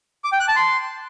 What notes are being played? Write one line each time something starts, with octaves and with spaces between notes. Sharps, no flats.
D6
G5
F#6
A5
C6